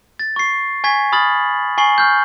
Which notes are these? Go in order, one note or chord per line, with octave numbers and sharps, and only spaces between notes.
A6
C#6 C7
G#5 C#6 G#6 B6
B5 D#6 F6 A6 F#7
G#5 C#6 C7 F#7 G7
C#6 F6 G6